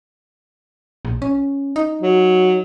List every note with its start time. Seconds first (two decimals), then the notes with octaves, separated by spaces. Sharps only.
1.05 A#1
1.22 C#4
1.76 D#4
2.02 F#3